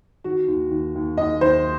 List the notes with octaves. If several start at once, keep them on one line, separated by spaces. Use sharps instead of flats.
D#3 F#4
D#2
D#2
D#2
D#2 D#5
D#2 C5